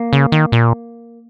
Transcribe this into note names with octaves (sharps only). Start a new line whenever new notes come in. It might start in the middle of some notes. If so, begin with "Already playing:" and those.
Already playing: A#3
C#3
D#3
A#2